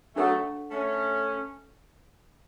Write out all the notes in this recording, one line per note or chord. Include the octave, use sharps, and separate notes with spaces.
F#3 A3 D4 A4 C#5 F#5 C#6
A3 C#4